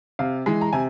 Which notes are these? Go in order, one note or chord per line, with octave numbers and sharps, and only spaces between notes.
C3 F5
E3 G#3
A#5
C3 G#5